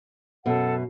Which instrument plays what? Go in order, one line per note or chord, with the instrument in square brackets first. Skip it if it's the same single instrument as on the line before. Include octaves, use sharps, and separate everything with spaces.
[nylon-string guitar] F#2 B2 [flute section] A4 F#5